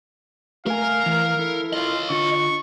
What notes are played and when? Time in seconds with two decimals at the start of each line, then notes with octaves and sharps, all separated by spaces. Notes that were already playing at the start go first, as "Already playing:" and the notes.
0.66 A3 A#4 F5 G#5
1.06 E3
1.39 E4 A4
1.73 F4 C#5 D#5
2.10 D3 F4 C#6